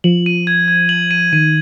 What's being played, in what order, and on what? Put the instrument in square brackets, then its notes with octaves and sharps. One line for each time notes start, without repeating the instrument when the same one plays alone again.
[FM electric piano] F3 [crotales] F#7
[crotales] D#7
G#6
G#6
F#7
D#7
[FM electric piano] D#3 [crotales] D#7